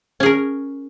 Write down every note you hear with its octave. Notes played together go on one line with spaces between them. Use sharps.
C#4 G#4 A#4